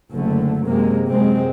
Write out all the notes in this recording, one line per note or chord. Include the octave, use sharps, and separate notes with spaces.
F#1 D3 A3
F#2 C3 G#3 A#3
F#2 C3 G#3 C4